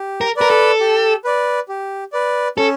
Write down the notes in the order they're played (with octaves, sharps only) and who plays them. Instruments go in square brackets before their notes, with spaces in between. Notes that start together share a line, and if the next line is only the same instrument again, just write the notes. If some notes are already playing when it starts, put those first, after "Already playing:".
Already playing: [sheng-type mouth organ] G4
[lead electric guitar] A#4
[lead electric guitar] A#4 [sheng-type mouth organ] B4 D5
[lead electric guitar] A4
[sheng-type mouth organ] G4
B4 D5
G4
B4 D5
[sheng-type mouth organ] C#4 [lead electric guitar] A4